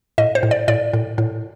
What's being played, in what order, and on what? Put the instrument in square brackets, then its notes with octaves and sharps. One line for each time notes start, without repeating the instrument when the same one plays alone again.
[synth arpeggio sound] A2 D#5
C5
A2
D5
A2 D5
A2
A2